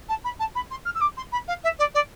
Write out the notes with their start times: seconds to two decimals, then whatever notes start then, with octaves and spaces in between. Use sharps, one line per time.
0.09 A5
0.24 B5
0.39 A5
0.55 B5
0.71 C6
0.85 F6
0.95 E6
1.01 D6
1.17 C6
1.32 B5
1.48 F5
1.64 E5
1.79 D5
1.94 D5